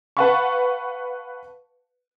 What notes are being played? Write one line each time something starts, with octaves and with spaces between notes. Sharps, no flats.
B4 F5 F#5 A5 B5 C#6